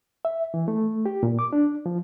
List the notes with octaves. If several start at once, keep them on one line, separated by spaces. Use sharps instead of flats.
E5
E3
A3
G4
A#2
D6
D4
F3